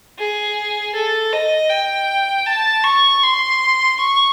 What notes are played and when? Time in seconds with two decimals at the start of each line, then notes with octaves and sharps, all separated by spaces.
0.18 G#4
0.95 A4
1.33 D#5
1.70 G5
2.46 A5
2.84 C#6
3.23 C6
3.98 C#6